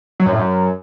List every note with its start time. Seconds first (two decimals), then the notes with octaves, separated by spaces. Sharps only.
0.20 F#3
0.26 F#2
0.33 A2
0.39 F#2